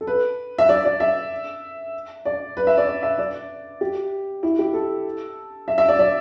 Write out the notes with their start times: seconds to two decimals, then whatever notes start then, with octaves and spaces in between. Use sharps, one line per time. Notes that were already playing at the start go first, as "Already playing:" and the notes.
0.01 A4
0.07 B4
0.58 E5
0.69 D5
0.85 D5
1.00 E5
2.25 D5
2.57 B4
2.67 E5
2.77 D5
2.87 D5
3.03 E5
3.18 D5
3.81 G4
4.43 E4
4.59 G4
4.73 A4
5.68 E5
5.78 E5
5.88 D5
5.99 D5